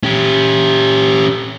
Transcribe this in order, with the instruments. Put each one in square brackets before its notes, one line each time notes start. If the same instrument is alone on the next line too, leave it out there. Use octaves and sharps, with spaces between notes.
[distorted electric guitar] C#4 G4